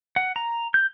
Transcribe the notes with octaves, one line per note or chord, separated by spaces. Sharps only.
F#5
A#5
G6